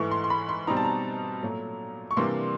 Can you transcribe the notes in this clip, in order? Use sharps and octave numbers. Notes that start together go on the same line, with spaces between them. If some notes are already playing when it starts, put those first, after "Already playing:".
Already playing: G#2 E3 A3 C#6
C6
C6
B5
C6
B2 G3 C4 D#4 A#5
A5
A#5
A#2 F#3 A3
C#6
C3 E3 G3 A#3 D4 C6